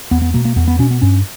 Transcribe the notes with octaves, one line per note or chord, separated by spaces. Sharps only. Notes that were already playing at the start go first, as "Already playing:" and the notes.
E2 B3
B3
B2 A#3
A#3
E2 B3
B3
B2 C#4
B3
G2 C#4